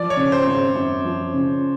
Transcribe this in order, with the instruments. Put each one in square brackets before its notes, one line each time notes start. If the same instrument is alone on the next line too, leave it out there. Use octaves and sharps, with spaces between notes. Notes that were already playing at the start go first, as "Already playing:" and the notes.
Already playing: [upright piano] F3 [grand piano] D5
[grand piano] C#5
[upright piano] C#3
[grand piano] C5
[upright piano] G#1
F#2
F3
C#3